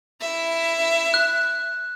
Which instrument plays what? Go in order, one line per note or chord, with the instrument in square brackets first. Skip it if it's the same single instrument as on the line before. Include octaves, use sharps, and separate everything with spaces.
[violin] E4 E5
[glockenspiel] F#6